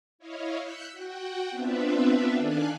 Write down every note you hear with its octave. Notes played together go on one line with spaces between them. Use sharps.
E4 C#5 D#5 F5
E6 F#6 G6 B6 C#7
F#4 F#5 G5
B3 C4 D4 F4 B4 E5
D#3 D4 A4 F5 G#5 F#6